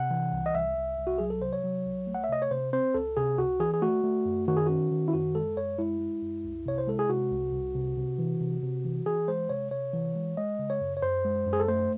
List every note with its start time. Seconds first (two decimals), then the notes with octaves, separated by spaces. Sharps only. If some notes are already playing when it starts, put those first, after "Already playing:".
Already playing: C3 F#5
0.11 E3
0.33 C2
0.46 D#5
0.54 C2 E5
0.77 C2
0.98 C2
1.07 F#4
1.18 F#3 G#4
1.30 A4
1.41 C3 C5
1.53 C#5
1.64 F#3
1.85 C2
2.07 A3
2.14 F#5
2.24 E5
2.29 C3 D#5
2.42 C#5
2.51 C3 C5
2.73 C4 C5
2.94 C#2 A4
3.17 C3 G#4
3.38 C#2 F#4
3.60 E3 G#4
3.74 G#4
3.82 A3 F#4
4.04 A3
4.25 F#2
4.48 D#3 F#4
4.57 G#4
4.66 C#4 F#4
4.91 D#3
5.08 E4
5.13 F#2 F#4
5.35 G#3 A4
5.56 F#2 C#5
5.78 G#3 E4
6.00 G#3
6.22 F#2
6.44 C2
6.66 C3 C#5
6.78 C5
6.87 G#3 A4
6.99 G#4
7.09 C3 F#4
7.31 C2
7.53 C2
7.75 C3
7.97 C3
8.18 E3
8.41 C3
8.63 C3
8.85 E3
9.06 E3 G#4
9.28 G#3 C5
9.49 C3 C#5
9.71 C3 C#5
9.93 E3
10.15 G#3
10.37 G#3 D#5
10.59 C#3
10.70 C#5
10.81 F#2
10.97 C#5
11.02 F#2 C5
11.25 G#3
11.46 F#2
11.53 G#4
11.60 A4
11.68 A3 C5